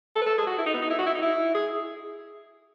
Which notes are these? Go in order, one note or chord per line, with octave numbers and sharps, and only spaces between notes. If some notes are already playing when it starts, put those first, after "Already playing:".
A4
B4
A4
G#4
F#4
E4
D#4
B3
D#4
E4
F#4
E4
D#4
E4
G#4